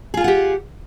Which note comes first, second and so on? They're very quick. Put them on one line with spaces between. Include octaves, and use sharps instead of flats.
G#4 F4 G#5 F#5 G4